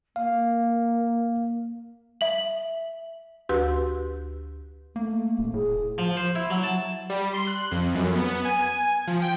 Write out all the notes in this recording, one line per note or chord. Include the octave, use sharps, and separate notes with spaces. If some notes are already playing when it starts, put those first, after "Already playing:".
A#3 F5
E5 F#7
D2 F#4 G4 B4 C6 E6
A3 A#3
A3
D#1
A2 G#4
F3
C5
E4
F#3
A5
G3
C6
F#6
F2
F#2
B3
G#5
F3
G5